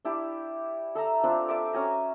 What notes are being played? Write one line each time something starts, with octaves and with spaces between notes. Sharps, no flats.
D4 E4 G4
A4 E5 A#5
C4 D4 F4 G5
D5 E5 D6
C#4 F#4 G#5 A#5